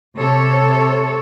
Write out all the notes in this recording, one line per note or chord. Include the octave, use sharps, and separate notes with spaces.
C3 A4 C#5